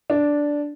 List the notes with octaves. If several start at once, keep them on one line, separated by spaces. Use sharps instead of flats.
D4